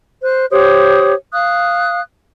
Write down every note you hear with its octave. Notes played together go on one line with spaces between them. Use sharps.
C5 F#6
G4 C5 C#5 D#6
F5 D#6 F#6